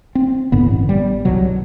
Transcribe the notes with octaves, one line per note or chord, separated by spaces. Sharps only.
C4
A1 G2 D3 B3
G3
C2 B2 F#3